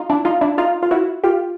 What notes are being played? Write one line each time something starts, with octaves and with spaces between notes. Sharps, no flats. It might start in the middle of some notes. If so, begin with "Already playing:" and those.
Already playing: D#4 F4
D4 E4
D#4 F4
D4 E4
D#4 F4
F4
E4 F#4
F4 G4